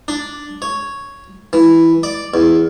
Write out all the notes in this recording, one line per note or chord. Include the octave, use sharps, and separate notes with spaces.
D4
C#5
E3
D5
E2